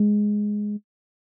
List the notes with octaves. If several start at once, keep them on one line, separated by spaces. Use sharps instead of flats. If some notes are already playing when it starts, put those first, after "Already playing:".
Already playing: G#3